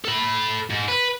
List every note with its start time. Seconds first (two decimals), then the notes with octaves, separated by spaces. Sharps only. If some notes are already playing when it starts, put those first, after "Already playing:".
0.05 A4 B5
0.70 G#2
0.88 B4